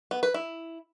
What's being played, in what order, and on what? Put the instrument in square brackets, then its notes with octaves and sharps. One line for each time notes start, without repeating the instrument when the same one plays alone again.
[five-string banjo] B3
B4
E4